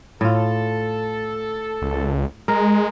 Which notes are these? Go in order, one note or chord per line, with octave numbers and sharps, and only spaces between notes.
A2 F4 A4
C#2
G#3 A#4